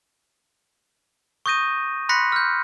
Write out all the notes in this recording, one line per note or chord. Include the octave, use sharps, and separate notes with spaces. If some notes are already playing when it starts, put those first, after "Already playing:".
C#6 D#6 G6 A#6 D#7
B5 C6 F#6 A#6 B6 C#7
F6 G6